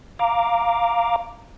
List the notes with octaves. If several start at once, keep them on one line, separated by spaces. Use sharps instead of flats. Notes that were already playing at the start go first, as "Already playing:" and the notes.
F5 A#5 D6